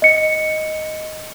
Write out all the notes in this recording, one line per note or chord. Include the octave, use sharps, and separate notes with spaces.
D#5 C#7